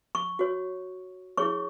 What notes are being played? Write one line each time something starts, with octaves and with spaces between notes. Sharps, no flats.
C#6
F#4 C#5
E4 G#4 C#5 C#6